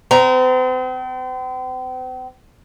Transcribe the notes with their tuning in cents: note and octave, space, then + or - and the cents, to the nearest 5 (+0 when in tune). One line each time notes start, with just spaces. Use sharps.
C4 -40 A#5 +0